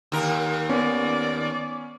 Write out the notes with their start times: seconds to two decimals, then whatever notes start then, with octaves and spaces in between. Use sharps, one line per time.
0.12 D#2 A#4
0.69 B3 C#4 D5